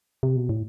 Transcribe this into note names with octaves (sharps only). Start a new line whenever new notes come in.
C3
B2
A2